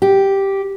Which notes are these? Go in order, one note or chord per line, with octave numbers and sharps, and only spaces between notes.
G4